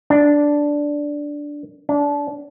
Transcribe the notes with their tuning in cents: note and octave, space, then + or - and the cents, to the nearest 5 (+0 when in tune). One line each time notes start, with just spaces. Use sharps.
D4 -5
D4 -25